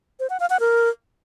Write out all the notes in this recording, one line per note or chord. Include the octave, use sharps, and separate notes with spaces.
C5
F#5
F5
F#5
A#4